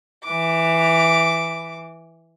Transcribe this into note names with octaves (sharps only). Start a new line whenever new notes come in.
E3 D6